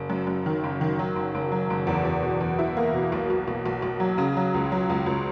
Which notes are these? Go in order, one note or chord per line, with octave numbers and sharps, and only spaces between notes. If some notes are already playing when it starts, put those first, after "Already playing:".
Already playing: F#1
F#2
F#2
D#3
F#1
D#3
F#3
F#1
F#1
F#3
F#1
E2
E2
B2
E2
E4
A#3
B2
B1
B1
B1
B1
B1
F#3
C#3
F#3
C#2
F#3
C#2
C#2